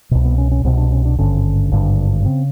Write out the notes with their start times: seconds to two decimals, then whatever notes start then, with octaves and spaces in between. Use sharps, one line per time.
0.11 C2 B2
0.25 B3
0.38 C#4
0.51 C#4
0.64 C2 B2 C4
0.78 D4
0.92 C#4
1.05 D4
1.18 G#1 G2 D3 C#4
1.71 G#1 G2 D3
2.25 C#3 C4